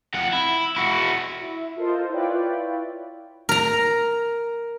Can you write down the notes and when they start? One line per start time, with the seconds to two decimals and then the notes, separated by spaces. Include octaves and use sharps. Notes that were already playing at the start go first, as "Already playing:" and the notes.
0.14 F2 F#5
0.33 E4
0.76 E4 F#4
1.41 E4
1.76 F4 A4 A#4 C5 D#5
2.10 E4 F4 B4 C#5 D5 G5
3.49 A#4 A#5